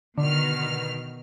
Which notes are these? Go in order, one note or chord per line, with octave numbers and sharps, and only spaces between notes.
B2 D3 D#3 F6